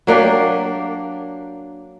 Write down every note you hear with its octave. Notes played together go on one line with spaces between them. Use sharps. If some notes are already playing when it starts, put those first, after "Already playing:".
F#3 A#3 D4 G4